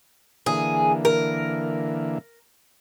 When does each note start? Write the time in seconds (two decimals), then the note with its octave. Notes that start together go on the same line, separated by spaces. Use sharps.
0.46 D3 E3 A#3 G#4
1.05 A#4